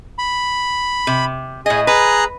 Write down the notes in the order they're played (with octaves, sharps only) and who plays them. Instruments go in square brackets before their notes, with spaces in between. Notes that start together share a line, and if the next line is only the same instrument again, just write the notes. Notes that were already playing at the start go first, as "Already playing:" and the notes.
[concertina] B5
[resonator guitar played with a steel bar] C3
[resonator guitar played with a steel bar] A2 D#5 [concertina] G#4
[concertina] G#4 A#5 F#6 [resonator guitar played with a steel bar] B4